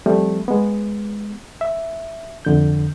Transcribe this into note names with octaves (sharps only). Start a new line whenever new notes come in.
F3 G3 A3 C4
G#3 B3
E5
F2 D3 G6